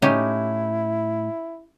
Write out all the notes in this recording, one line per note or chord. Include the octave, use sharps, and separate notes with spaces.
A2 C#4 D#4 E4 G4